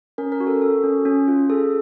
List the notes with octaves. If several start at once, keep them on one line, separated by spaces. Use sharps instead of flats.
C#4 A#4
A#4
F#4
A4
A4
C#4
C#4
F4
G#4 A4